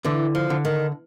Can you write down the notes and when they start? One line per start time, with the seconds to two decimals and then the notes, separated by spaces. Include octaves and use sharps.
0.04 D3 E3
0.35 F3
0.50 D3
0.65 D#3